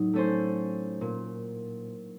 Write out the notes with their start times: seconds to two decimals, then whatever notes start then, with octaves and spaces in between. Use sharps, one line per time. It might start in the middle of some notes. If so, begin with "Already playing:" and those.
Already playing: A2 F#3 D#4
0.13 A3 C#4 A4 C5
1.01 A#2